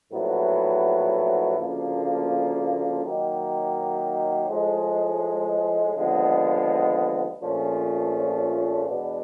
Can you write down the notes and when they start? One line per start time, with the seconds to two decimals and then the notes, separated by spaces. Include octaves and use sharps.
0.12 A#1 A2 F#3 B3 E4
1.58 D2 C#3 F3 A#3
3.04 D#3 F#3 A#3 D#4 G4
4.50 A2 F3 G#3
5.96 D#2 D3 F3 G#3 B3
7.42 A#1 A#2 F3 A3 C#4
8.88 E2 B2 G#3 B3 D4